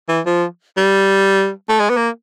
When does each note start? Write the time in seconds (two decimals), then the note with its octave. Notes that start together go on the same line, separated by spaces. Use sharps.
0.08 E3
0.26 F3
0.77 G3
1.69 A3
1.80 G#3
1.90 B3
1.96 A#3